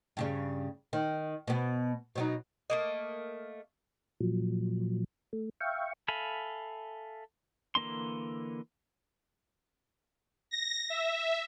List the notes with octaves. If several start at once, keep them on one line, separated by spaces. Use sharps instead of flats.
G2 C#3 G3
D#3
B2 B3
B2 F#3 D#4
A3 A#3 D#5
A#2 F3 F#3
A3
E5 F5 G5 C#6
A4 E5 F5 G#5 B5
D3 E3 A#3 D4 C6
A#6
E5